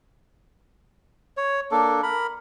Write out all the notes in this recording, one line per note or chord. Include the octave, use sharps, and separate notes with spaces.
C#5
A#3 D4 A4
A#4 B5